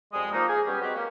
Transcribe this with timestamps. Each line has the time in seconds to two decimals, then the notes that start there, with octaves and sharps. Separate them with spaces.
0.13 F2 G3 G#3 G#4 D#6
0.32 F3 A#3 D#4
0.48 G#4
0.67 G3 B3 C#4 G4
0.81 F#3 G#3 C4 F#4 G4
0.95 A#3 C#4